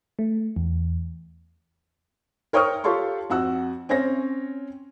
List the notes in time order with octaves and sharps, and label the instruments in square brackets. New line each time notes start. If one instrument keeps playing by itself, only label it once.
[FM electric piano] A3
E2
[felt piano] A#4 C#5 G5 C#6 D#6 F6
F4 G4 A4 C#5 C6 C#6
F2 F#4 F#5 E6
C4 C#4 C#5 A#6